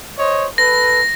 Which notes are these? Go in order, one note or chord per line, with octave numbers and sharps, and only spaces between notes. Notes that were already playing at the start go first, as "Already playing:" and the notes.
C5 C#5 D#5
A4 B4 A#6